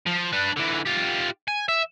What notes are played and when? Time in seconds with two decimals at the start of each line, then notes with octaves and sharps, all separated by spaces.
0.07 F3
0.33 D4 B4
0.56 D3 E3
0.86 F4 G4
1.48 G#5
1.68 E5